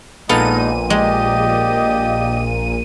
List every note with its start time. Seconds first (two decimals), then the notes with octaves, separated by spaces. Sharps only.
0.29 A#1 A#2 G#3 B3 D#4 A4 F5 D#7
0.90 G#3 G4 D5 D#5